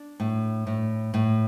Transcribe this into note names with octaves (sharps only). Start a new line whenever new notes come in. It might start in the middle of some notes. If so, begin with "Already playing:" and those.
Already playing: D4
A2
A2
A2